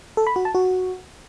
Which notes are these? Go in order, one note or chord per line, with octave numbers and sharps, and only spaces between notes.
A4
B5
F#4
A5
F#4